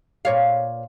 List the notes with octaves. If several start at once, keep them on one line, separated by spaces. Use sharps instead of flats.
A#2 C#5 F5